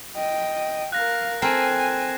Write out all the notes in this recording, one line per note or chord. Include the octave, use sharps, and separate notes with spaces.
D#5 G5
A#4 F5 F#6 A#6
C4 A4 A#4 G#5 C7 E7